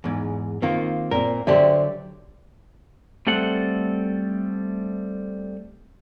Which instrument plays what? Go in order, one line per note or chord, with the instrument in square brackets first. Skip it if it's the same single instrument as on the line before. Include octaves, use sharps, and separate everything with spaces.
[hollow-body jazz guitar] E2 G#2
[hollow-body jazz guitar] D#3 A#3 [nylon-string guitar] C4 F4
[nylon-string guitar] A#2 C4 [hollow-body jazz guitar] A#4
[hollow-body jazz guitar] D3 F#3 G4 [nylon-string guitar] C5 D5 E5
[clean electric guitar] G3 A3 C4 A4 F#5